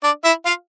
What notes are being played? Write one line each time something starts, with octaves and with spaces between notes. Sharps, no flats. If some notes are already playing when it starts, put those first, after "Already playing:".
D4 D5
E4 E5
F4 F5